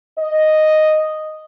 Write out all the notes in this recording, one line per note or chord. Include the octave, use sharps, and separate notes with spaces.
D#5